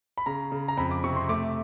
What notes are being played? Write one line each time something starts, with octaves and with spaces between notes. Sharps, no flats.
B5
C#3 A#5
C#3
A#5
F2 B5
D6
C3 C#6
C6
A3 D6